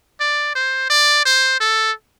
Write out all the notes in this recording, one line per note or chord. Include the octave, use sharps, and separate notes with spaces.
D5
C5
D5
C5
A4